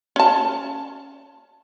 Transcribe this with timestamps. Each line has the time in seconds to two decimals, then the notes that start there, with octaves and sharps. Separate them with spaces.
0.16 C#4 A5